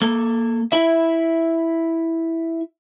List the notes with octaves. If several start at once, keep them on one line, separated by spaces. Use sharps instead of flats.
A#3 A4
E4 E5